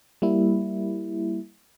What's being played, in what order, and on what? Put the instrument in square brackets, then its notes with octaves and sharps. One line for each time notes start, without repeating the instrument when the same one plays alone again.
[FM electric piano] G3 A#3 E4